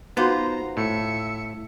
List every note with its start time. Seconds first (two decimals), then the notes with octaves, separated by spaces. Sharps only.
0.17 B3 D#4 F4 F#4 C5 A#5
0.77 A2 E5 C#7